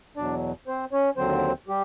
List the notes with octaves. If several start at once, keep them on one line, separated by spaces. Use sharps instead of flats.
E2 B2 F#3 D4 D5
C4 C5
C#4 C#5
D#2 D3 F#3 C4 C5
G3 G4